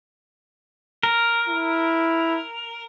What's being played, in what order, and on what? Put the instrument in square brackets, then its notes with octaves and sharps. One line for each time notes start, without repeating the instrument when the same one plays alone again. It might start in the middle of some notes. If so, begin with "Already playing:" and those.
[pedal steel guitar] A#4
[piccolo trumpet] E4